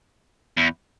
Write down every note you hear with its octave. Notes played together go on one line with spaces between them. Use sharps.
E2